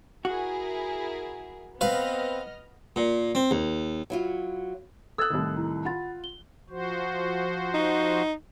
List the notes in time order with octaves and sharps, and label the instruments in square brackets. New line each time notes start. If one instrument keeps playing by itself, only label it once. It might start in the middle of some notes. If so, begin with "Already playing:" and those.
[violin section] E4 G#4 A#4 [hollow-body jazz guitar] F#4
[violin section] B3 D#5 F6 [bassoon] C4 [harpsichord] B4 F5
[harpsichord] A#2
C4
D#2
[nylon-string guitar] F#3 E4 F4
[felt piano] A4 F#6 [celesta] D#6 G#6 A6 [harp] E6
[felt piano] C2 A2 D#3
[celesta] E4 A#5
[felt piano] F4 [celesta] F#5 B5 A6
[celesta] G7
[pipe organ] F3 F#4 C5
[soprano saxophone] D#4